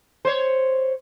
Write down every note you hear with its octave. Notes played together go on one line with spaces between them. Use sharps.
C5 C#5